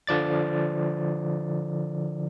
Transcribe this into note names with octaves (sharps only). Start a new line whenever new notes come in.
D3 F3 D5 A6